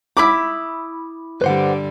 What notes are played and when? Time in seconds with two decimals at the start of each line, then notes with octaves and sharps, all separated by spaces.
0.17 E4 B5 D6 D#6
1.42 G2 D3 G3 B4 C5 F#5